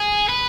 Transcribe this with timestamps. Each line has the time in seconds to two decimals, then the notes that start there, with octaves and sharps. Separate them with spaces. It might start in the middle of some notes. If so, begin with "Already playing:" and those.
Already playing: G#4
0.29 B4